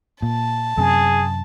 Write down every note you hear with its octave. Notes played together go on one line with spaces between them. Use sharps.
A#2 A5
F#2 C3 G#4